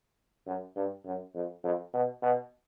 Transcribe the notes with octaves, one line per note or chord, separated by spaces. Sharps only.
F#2
G2
F#2
F2
F2
B2
B2